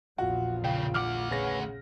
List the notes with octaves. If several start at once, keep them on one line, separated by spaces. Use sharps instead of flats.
A#1 E2 A#2 F4 F#4
C#3 G5
D2 F#5 D6 F6
C#3 B4 C#5 G#5 A#6